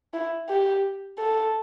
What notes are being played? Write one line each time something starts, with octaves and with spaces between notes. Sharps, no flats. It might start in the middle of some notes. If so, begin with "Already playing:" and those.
E4
G4
A4